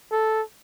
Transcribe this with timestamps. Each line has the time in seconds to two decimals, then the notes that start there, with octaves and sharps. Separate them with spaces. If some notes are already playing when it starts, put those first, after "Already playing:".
0.12 A4